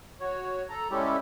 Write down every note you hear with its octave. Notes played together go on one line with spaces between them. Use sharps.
F#4 C#5
A4 A#5
G3 G#3 C#4 E4 G4 A4